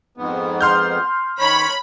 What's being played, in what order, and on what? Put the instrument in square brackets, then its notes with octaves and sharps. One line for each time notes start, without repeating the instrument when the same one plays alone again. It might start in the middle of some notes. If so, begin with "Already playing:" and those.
[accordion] F2 G#2 B3
[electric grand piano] C6 F6 G6
[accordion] D#3 [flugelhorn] C#5 [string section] B5